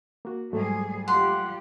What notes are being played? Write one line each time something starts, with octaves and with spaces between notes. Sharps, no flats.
A#3 F#4
G#2 F#3 G3 A3 G#4
G3 F4 G4 F#5 C6